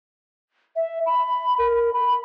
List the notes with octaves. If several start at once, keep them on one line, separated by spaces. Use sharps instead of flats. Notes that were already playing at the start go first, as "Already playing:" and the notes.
E5
B5
A#4
B5